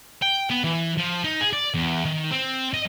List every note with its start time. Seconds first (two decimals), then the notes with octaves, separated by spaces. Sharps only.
0.22 G5
0.50 B3
0.64 E3
0.98 F3
1.24 D#4
1.41 G#4
1.53 D5
1.74 E2
2.05 D#3
2.31 C4
2.74 D#5